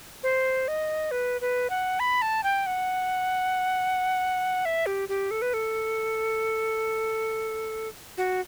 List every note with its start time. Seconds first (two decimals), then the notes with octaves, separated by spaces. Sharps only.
0.23 C5
0.68 D#5
1.11 B4
1.41 B4
1.70 F#5
2.00 B5
2.22 A5
2.43 G5
2.66 F#5
4.65 E5
4.86 G4
5.09 G4
5.31 A4
5.42 B4
5.54 A4
8.17 F#4